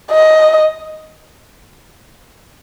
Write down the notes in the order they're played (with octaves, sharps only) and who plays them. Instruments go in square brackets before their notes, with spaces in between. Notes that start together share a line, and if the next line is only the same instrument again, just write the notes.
[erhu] D#5